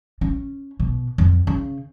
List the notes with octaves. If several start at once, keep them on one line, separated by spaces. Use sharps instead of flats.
C#4
B2
F2
C#3